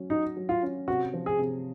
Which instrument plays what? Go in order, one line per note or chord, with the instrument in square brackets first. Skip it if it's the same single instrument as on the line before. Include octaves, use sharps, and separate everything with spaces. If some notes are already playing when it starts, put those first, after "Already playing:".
Already playing: [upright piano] F#3 C#4
[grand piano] D#4 [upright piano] F#4
[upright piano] F#3
[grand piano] F4
[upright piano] C#4
[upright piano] C3 [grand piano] F#4
[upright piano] F3
[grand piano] G#4
[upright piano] C3